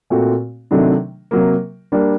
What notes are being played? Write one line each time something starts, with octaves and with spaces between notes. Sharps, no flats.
A#2 A3 C4 F#4
C3 D#3 F#3 A3 D4
C3 F#3 A#3
G3 A#3 D4